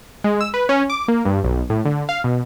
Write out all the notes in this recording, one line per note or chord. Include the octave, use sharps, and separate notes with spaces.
G#3
E6
B4
C#4
D6
A#3
G2
B1
A2
D3
F5
B2